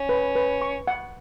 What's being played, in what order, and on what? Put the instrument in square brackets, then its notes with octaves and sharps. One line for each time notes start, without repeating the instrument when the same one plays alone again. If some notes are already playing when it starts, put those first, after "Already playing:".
Already playing: [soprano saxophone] C#4
[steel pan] B4
B4
C#6
F#5